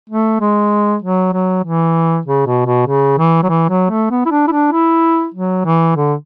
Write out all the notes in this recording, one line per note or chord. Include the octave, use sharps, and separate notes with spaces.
A3
G#3
F#3
F#3
E3
C#3
B2
B2
C#3
E3
F#3
E3
F#3
A3
B3
E4
D4
E4
D4
E4
F#3
E3
D3